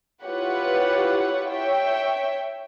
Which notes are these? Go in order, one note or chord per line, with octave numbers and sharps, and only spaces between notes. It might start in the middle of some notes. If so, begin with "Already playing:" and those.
E4 F4 G4 B4 C#5 F#5
C#5 E5 G5